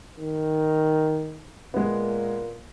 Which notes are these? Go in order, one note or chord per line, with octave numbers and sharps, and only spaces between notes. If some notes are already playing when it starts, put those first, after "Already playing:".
D#3
A#2 G#3 B3